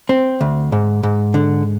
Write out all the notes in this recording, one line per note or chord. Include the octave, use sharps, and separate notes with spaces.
C4
D2
G#2
G#2
D3